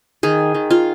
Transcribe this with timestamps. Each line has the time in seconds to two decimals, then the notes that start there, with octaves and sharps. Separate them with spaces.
0.23 D#3 G#4
0.55 D#3
0.70 F4